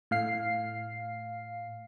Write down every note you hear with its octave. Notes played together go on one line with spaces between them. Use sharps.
A2 F5 C7